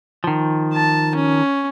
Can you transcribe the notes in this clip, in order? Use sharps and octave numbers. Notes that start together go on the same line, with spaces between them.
D#3 F3
A5
C#4